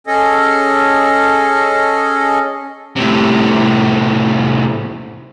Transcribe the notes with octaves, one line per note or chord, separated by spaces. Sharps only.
C#4 G#4 A4 D#5
A2 C3